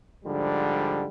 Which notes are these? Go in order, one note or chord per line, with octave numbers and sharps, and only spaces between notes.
G#2 D3 F3 G3